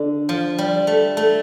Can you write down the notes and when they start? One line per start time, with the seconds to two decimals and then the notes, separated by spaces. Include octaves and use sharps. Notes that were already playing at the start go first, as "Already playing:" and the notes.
Already playing: D3
0.29 F3
0.58 G3
0.87 A3
1.17 A3